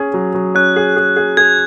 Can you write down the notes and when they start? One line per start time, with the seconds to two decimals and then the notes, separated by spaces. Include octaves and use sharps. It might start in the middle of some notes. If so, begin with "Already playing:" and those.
Already playing: C#4 G#4
0.14 F#3
0.34 F#3
0.55 C#4 F#6
0.76 G#4
0.96 G#4
1.17 G#4
1.37 G#4 G#6